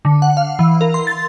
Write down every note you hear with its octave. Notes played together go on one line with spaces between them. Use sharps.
D3
F#5
F5
E3
A#4
C6
A6